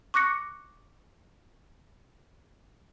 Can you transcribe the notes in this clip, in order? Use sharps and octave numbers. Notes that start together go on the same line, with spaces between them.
C#6 D6 F#6 A#6 C#7